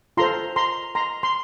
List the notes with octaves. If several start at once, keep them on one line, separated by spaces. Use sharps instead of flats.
F4 A4 C5 A#5 C6
A#5 C6
A#5 C6
C6